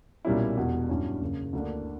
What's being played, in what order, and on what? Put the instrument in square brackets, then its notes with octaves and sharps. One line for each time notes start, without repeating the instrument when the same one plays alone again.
[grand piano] B1 A#2 G3 C#4 E4
E1 E2 B2 G3
G2 F#3 C#4 E4
F#1 E2 C#3
D2 D3 A#3 D4